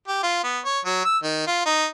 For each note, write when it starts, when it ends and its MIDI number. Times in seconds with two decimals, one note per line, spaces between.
0.08 0.21 67
0.23 0.43 65
0.44 0.59 59
0.65 0.79 73
0.85 1.00 54
1.05 1.18 88
1.23 1.45 51
1.47 1.65 65
1.66 1.86 63